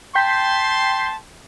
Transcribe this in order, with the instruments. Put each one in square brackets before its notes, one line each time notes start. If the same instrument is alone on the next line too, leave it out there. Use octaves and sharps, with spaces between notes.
[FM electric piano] G5 G6 B6 [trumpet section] A5 C6